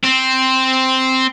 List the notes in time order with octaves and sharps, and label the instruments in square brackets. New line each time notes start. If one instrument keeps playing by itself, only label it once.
[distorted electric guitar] C4